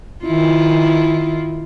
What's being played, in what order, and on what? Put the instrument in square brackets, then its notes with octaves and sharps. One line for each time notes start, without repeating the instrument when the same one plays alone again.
[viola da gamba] D#3 E4 F4